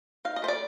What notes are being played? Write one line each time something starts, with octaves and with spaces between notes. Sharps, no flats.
D#4 F5
D#5
A3 C5
D5